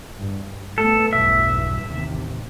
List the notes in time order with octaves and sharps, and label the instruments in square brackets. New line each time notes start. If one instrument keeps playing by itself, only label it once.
[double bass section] G2
[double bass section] A3 B3 [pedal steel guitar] A4
[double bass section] B1 E2 G2 [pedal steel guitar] E5
[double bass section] A1 D#2 C3